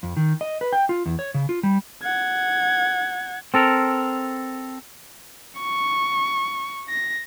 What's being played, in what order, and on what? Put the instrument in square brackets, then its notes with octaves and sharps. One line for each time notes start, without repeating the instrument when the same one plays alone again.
[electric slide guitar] F2
D#3
D#5
B4
G5
F4
E2
C#5
C#3
F4
G3
[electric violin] F#5 G#6
[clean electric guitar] C4 A4 A#4
[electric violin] C#6
A#6